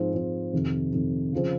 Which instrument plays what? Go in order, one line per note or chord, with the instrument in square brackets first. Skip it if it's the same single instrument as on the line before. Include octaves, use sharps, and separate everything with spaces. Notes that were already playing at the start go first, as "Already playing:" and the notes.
Already playing: [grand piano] G#2 F3 C4
G#2 F3 C4
F2 C3 D#3
F2 C3 D#3
C#3 F3 C4